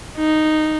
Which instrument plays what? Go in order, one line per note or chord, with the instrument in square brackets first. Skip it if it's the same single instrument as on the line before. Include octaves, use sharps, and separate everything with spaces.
[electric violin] D#4